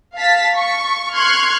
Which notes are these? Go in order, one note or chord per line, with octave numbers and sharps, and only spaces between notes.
F5 A5 A6 B6
C#6
C6 C#6 F6 F#6 G#6 C7